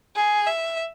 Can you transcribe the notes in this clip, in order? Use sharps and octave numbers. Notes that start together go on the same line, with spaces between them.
G#4
E5